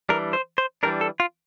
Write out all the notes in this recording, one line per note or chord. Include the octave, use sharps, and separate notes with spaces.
E3 G3 D4 A#4
C5
C5
E3 G3 D4 A#4
A4
F4